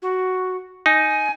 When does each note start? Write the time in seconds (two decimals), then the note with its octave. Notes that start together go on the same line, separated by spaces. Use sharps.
0.02 F#4
0.86 D#4 G#5